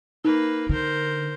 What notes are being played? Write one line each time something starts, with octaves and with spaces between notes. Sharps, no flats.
A#3 D#4 B4
D3 A#4 C5